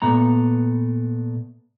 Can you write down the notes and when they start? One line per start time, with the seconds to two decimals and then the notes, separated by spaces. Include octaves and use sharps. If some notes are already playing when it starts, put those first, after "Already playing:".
0.02 A#2 A3 B3 A#5